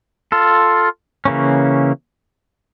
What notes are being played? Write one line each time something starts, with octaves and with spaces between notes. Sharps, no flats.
F4 A4
C#3 E3 A#3 C#4